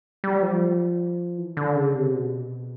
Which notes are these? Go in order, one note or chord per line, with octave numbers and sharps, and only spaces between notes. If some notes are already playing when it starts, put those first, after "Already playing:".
G3
F3
E3
D3
C#3
C3
B2